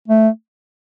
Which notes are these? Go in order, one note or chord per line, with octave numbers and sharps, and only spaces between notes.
A3